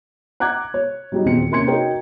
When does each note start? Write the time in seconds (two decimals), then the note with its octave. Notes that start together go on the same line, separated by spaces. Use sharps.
0.40 F#5 A#5 D6 F#6 G#6
0.74 C#5
1.12 F#3 G3 D#4
1.25 D#1 E2 C4 C#7
1.51 C3 A#3 C#4 C6 G#6 C#7
1.67 D#4 F#4 A#4 C#5 G5